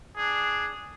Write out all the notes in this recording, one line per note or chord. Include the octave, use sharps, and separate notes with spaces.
D4 G#4